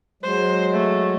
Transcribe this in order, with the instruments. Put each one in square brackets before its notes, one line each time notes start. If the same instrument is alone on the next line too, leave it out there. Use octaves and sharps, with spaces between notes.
[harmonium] F#3 G#3 [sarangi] C5
[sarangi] A3